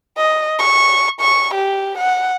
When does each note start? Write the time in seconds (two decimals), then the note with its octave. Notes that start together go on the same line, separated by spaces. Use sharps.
0.18 D#5
0.59 C#6
1.21 C#6
1.54 G4
1.98 F#5